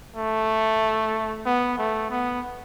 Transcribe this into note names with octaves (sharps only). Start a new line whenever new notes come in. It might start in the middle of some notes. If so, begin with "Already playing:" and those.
A3
B3
A3
B3